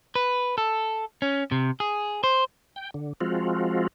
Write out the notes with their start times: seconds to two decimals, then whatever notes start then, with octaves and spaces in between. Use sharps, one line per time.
0.15 B4
0.58 A4
1.22 C#4
1.52 C3
1.80 G#4
2.24 C5
2.76 G5
2.94 D3
3.21 F3 G#3 C4 F4 F#4